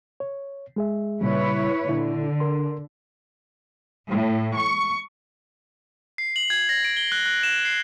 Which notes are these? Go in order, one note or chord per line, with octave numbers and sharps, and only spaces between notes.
C#5
G#3 G#4 E5
A#2 C#3 G3 E4 B4 C#5
A#2 D3 E4
A#4 C6
A2
C#6
C7
F#7
G#6
A#6
D7
G7
F#6
F#6
E7
C7